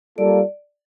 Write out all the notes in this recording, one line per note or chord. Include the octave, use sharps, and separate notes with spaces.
G3 A#3 F4 A4 D5